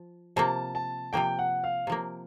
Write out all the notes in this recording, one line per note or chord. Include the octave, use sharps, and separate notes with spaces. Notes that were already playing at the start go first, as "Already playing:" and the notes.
Already playing: F3
C3 F3 A#3 A5
A5
C3 F3 A#3 G5
F#5
F5
C3 F3 A#3